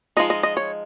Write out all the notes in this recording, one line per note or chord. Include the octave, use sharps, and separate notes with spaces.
F3 G#3 D#4 D#5
D#5
D#5
C#5